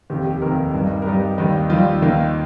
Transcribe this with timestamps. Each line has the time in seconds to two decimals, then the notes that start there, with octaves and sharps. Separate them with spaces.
0.10 F1 D#2 D#3 G4
0.26 G4
0.42 F1 D#2 D#3 A#4
0.74 G2 G3 D#4
1.02 A#4
1.06 G2 G3 D#4 G4
1.38 D#2 D#3 G3 D#4
1.70 D#2 D#3 G3 D#4 F4
2.02 D#2 D#3 A#3 D#4